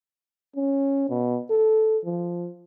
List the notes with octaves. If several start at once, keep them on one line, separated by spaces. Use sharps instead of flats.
C#4
B2
A4
F3